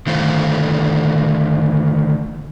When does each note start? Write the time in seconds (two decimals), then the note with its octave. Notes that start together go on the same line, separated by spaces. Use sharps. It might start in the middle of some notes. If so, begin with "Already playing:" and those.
0.07 D3 D#3 A3 F4 C5